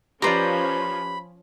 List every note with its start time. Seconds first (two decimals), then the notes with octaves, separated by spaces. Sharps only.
0.22 F3 C#4 G4 B4 C5 D5 A#5 B5